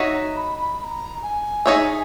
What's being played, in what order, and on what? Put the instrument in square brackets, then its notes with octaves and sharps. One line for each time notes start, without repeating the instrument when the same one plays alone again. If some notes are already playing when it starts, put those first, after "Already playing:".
Already playing: [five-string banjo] D#4 F#4 C#5 E5
[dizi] A#5
B5
B5
B5
A#5
G#5
[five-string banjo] D#4 G#4 C#5 E5